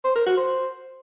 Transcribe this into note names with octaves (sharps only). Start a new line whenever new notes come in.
C5
A#4
F#4
C5